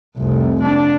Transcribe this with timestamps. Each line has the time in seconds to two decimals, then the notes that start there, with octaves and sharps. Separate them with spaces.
0.17 F1 C2
0.63 D4